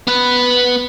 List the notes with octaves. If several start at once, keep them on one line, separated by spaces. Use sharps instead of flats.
B3 B4